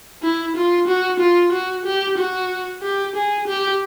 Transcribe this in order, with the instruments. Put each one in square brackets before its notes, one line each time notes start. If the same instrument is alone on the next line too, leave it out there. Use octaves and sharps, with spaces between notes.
[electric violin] E4
F4
F#4
F4
F#4
G4
F#4
G4
G#4
G4